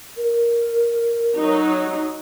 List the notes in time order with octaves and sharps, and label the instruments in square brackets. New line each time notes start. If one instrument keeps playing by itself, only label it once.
[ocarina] A#4
[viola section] F#3 D#4